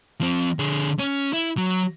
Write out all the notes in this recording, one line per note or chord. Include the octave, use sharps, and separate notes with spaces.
F3 C4
D3 G#4
C#4
E4
F#3